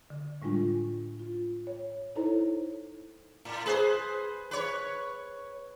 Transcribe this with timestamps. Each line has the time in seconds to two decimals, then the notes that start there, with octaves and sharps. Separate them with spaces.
0.10 D3
0.42 A2 G3 G#3 D4 F4
1.19 F4
1.67 C#5
2.16 D#4 E4 A4 C5 C#5 A#5
3.45 A2
3.66 G#4 B4 C5
4.51 B4 C#5